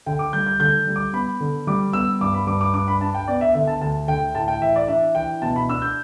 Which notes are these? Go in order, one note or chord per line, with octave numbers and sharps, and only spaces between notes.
D3 G5
D6
G3 G6
G6
D3 G6
G3
D6
B3 B5
D3
G3 D6
B3 E6
G2 D6
B5
G2 D6
D6
D4 D6
B5
D4 A5
G5
B3 D5
E5
D3 E5
A5
D2 A5
D3 G5
A2 A5
G5
E3 E5
D5
D4 E5
E3 G5
B2 A5
B5
D4 E6
G6